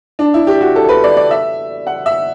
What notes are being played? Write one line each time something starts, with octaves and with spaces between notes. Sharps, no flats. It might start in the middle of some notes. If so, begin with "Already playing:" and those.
D4
E4
G4
F#4
A4
B4
D5
D5
E5
F#5
E5